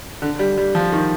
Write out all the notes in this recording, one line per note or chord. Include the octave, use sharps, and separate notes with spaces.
D3
G3
G3
F3
D#3